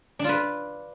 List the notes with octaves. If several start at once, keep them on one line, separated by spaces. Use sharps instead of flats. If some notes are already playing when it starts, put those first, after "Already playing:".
D4 F4 B4